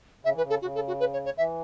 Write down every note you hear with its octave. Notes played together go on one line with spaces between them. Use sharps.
C#3 E5
E3
B4
C#3
A4
C#3 F#4
A4
F#4
B4
C#5
C#5
E3 E5